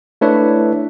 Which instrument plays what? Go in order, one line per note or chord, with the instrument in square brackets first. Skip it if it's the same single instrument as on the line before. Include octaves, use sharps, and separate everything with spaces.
[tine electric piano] A3 D4 E4 B4 C#5 E5